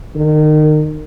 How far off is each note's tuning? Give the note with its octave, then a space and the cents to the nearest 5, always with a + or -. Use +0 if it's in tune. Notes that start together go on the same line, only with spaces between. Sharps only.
D#3 -30